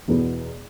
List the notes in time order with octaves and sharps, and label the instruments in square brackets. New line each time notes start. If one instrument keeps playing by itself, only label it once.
[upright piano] E2 B2 B3